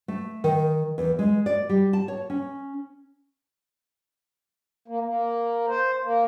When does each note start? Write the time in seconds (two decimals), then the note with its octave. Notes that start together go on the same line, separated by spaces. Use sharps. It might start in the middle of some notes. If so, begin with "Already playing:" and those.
0.08 A3
0.44 D#3
0.98 E2
1.19 G#3
1.46 D5
1.69 G3
1.93 A5
2.08 C#5
2.30 C#4
4.88 A#3
5.06 A#3
5.68 C5
6.04 A#3